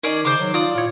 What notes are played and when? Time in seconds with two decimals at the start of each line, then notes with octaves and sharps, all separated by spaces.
0.03 D#3 C#4 D#4 G#4 D5
0.25 C#3 C5 D6
0.40 F#3
0.54 F4 D5 D#6
0.75 A2 F4 C#5